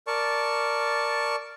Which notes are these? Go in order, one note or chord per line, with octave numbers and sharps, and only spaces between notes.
A#4 D5 A5 C#6